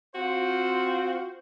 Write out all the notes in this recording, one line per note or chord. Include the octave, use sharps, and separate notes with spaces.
C4 F4 F#4 C5